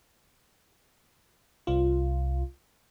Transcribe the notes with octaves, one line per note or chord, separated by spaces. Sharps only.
C2 F4